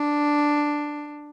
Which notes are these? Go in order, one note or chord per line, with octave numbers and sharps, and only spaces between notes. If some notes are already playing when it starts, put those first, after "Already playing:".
Already playing: D4